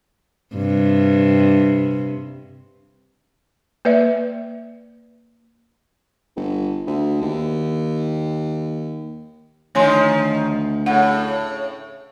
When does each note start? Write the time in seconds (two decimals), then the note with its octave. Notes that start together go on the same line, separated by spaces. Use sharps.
0.55 G2 C3
3.85 A#3 B4 D5 E5
6.36 G1
6.87 D2
7.21 D#2
9.75 D2 D#3 F3 C#5 G#5 C6
10.86 A2 C#3 F#5